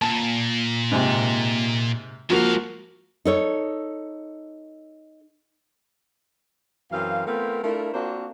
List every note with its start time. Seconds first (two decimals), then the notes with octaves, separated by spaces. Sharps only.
0.01 A#2 A5
0.91 G#2 C3
2.30 G#2 F3 A#3 F#4 F5
3.25 D#4 A4 C#5
6.92 F#2 E3 C4 F5
7.27 A3 B3 C4 F4 A#4
7.64 A3 D4 E4 F4 A4 A#4
7.94 A#3 C4 D4 F4 F#4 C5